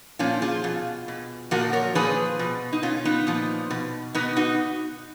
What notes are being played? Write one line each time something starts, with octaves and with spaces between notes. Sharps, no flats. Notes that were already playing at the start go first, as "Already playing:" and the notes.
A#2 F3 C#4 F4
F4 G#4
B2
B2
A#2 F3 F#4 A#4
A#4 C#5
A#2 F3 G#4 B4
B2
D#4
B2 C#4 F4
B3 D#4
A#2 F3
B2
B2 B3 D#4
D#4 F#4